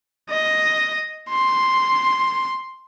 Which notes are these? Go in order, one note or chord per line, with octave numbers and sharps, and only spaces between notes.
D#5
C6